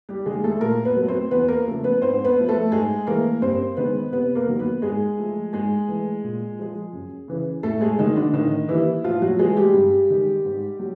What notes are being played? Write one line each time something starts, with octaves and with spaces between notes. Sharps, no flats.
G3 G4
D#3 G3 G#3 A#3 G#4
A3 A4
A#2 A#3 A#4
B3 B4
F#3 A3
C4 C5
E2 B3 B4
A#3 A#4
C#3 F3 A3
B3 B4
G#2 C4 C5
B3 B4
A3
F3
A3 A4
G#2 G#3 G#4
E3 A3 A#3 A#4
G2 C4 C5
D#3 G#3 B3 B4
C3 B3 B4
A#3 A#4
D#3 F#3 A#3
B3 B4
G#2 G#3 G#4
F3 A3
G#2 G#3 G#4
E3 A3
A#2
F3 G#3
F#2
C#3 E3
A2 A3 A4
G#3 G#4
D#3 F#3 A3 D#4
D3 D4
A2 D#3 D#4
E3 G3 A#3 E4
A2 F3 F4
F#3 F#4
E3 G#3 A3 G#4
G3 G4
G2
D#3 G#3
G#2
F#3